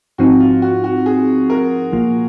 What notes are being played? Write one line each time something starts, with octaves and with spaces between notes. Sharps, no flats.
G#2 F3 C4 D#4 F#4
F4
F#4
F#4
G#4
A#4
C2 A#2 F3 A#3 F4